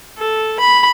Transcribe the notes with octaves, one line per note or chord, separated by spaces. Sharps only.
A4
B5